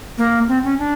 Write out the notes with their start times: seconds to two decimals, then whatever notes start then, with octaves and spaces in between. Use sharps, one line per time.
0.18 A#3
0.48 C4
0.64 C#4
0.79 D4